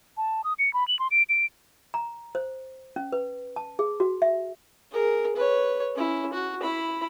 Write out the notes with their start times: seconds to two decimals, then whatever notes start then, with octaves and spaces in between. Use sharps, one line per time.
0.17 A5
0.44 D#6
0.59 C#7
0.74 B5
0.88 F#7
0.99 C6
1.11 D7
1.29 D7
1.94 A#5
2.35 C5
2.96 C#4
3.12 B4
3.56 A5
3.79 G#4
4.00 F#4
4.22 E5
4.91 G#4 A#4
5.36 B4 C#5
5.95 C#4 E4
6.33 F#4
6.61 E4 B5